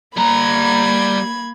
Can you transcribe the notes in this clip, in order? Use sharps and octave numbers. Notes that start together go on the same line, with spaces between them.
G3 A#3 A#5 B5 G#6